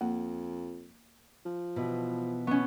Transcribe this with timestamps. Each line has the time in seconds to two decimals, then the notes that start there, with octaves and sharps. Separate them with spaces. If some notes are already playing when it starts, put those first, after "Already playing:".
0.01 F2 A#3
1.45 F3
1.76 B2 E3
2.47 B3 C#4 C#6